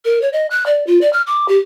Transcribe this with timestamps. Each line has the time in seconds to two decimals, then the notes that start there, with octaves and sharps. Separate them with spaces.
0.05 A#4
0.22 C#5
0.33 D#5
0.51 F#6
0.66 D5
0.87 F4
1.01 D5
1.13 F6
1.27 D6
1.48 G4